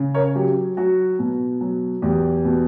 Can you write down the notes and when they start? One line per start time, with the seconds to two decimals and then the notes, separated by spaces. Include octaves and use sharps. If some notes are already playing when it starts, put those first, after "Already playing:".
Already playing: C#3
0.15 A#4 C#5
0.35 F#3 G4
0.77 F#3 F#4
1.19 B2
1.61 F#3
2.02 E2 G4
2.45 B2